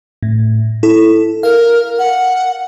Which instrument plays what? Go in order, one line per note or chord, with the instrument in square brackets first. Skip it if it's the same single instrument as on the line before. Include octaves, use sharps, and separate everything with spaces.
[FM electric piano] A2
E4 A4
[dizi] A#4 [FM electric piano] F5
[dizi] F#5